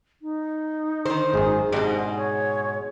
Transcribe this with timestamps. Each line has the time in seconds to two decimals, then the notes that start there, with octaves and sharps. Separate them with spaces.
0.22 D#4
1.05 D3 D#3 C5
1.34 G#1 F#2 G#4
1.72 G#2 B2 C4 D4 G4 G#4
2.17 C#5